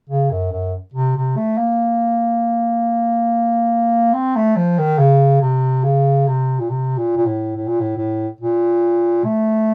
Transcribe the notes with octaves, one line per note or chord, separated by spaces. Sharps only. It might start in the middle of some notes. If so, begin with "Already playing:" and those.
C#3
F#2
F#2
C3
C3
A3
A#3
C4
A3
F3
D#3
C#3
C3
C#3
C3
A#2
C3
A#2
A#2
A2
A2
A#2
A2
A2
A#2
A3